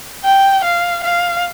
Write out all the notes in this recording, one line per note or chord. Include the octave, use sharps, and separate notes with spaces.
G5
F5
F5